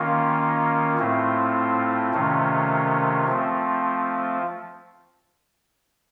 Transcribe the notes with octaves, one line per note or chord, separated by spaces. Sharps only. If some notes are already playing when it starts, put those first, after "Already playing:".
Already playing: D#3 A#3 C#4 F4
A2 A3 C4 F4
C3 D#3 A3 C#4 F4
F3 A3 C4 F4